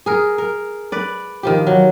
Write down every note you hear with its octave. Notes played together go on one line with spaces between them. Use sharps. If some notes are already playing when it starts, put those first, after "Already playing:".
G#4 A#4
A#4
B4 D5
D#3 F3 G4
F#3